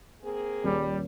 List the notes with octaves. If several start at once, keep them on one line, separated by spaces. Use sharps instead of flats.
A#3 C4 G#4
D#1 G3